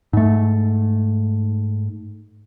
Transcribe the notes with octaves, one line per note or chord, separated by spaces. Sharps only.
G#2 A3